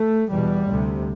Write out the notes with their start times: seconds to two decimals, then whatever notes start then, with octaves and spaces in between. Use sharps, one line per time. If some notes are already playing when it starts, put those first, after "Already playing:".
Already playing: A3
0.31 E2 B2 G3
0.69 D2 C3